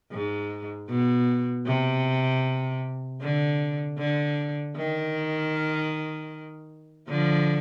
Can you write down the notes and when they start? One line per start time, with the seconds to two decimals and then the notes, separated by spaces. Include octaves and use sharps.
0.11 G#2
0.89 B2
1.67 C3
3.21 D3
3.98 D3
4.76 D#3
7.09 D3 F3